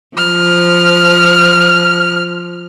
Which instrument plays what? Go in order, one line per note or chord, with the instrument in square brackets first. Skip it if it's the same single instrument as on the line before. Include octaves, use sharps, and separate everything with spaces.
[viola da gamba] F3 [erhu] F6